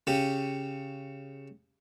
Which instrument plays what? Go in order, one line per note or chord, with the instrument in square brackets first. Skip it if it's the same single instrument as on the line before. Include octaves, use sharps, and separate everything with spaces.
[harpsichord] C#3 G4